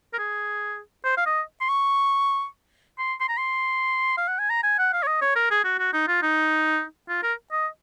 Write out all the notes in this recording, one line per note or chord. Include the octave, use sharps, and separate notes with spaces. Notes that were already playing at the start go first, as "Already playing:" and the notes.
A#4
G#4
C5
F5
D#5
C6
C#6
C6
C6
A#5
C6
F5
F#5
G#5
A#5
G#5
F#5
F5
C#5
D#5
C#5
A#4
G#4
F#4
F#4
D#4
F4
D#4
F4
A#4
D#5